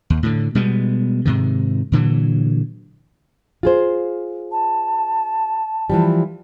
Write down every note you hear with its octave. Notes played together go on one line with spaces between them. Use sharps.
D#2
A2 D3
B2 G3 G#3 B3
G#2 C3 D#3
A#2 D3 E3 F#3
F4 G#4 C5
A5
E3 F3 G3